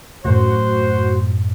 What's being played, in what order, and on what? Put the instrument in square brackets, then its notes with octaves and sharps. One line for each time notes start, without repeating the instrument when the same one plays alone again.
[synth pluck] F#2 A2 [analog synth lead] F#4 [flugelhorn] C5